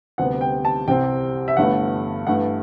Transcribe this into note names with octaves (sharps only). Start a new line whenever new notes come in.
D2 C3 G3 B3 F#5
G5
A5
C2 C3 G3 C4 G5
E5
G1 G2 E3 A3 F#5
G2 E3 A3 F#5